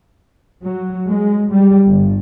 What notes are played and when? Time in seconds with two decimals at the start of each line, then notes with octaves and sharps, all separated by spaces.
0.63 F#3
1.08 G#3
1.51 G3
1.87 G1